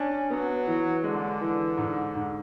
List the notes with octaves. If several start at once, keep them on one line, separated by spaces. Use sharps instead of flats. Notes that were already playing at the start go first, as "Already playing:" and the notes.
Already playing: C#4 D4
F#3 B3
E3
D3 G#3
E3
G#2
G#2